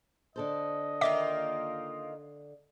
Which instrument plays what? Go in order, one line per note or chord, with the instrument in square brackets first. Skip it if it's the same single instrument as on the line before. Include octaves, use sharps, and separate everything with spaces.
[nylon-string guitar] D3 A4 C5 [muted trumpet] D#5
[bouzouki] D#3 A#3 F4 [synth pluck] E5 D6